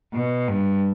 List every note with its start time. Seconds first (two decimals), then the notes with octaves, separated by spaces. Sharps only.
0.14 B2
0.48 G2